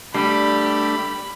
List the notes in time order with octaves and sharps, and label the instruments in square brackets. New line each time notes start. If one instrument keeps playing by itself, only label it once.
[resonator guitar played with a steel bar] G3 [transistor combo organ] A3 D4 [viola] G4 [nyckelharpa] B5